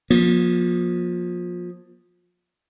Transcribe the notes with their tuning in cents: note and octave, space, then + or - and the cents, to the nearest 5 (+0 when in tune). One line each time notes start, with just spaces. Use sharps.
F3 +25 A#3 +40